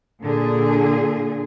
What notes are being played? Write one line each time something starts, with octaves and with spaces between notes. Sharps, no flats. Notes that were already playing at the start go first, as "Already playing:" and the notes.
A#2 D3 G#4